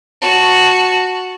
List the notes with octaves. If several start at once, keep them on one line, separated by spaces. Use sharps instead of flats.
F#4 A5